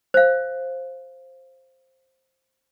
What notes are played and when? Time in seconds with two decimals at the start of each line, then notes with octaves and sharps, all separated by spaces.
0.14 C5 F5